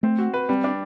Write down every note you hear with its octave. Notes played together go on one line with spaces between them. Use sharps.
A3 C4
F#4
B4
G3 C4
D4